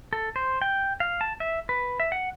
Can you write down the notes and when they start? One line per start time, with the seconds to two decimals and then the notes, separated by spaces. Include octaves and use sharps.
0.13 A4
0.36 C5
0.62 G5
1.00 F5
1.21 A5
1.40 E5
1.69 B4
2.00 E5
2.12 F#5